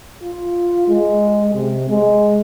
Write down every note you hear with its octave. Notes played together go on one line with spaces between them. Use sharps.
F4
G#3
C3
G#3